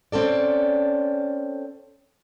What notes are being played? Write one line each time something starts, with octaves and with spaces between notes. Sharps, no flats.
C4 C#4 A4 D5